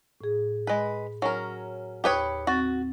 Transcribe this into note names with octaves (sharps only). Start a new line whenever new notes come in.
A2 G#4
G#3 B4
F#3 C#4 A#4
D#2 G4 B4 C#5 D#6
C4 F#4 A6